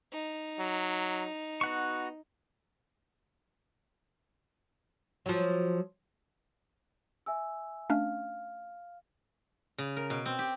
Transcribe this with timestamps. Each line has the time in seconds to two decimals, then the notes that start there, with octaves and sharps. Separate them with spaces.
0.13 D#4
0.59 F#3
1.61 B3 F#4 F#5 C#6
5.26 F3 F#3
7.26 E5 G#5 E6
7.90 A3 C#4 D4 F5 F6
9.78 C#3
9.97 A#4
10.10 B2
10.26 C4
10.39 G4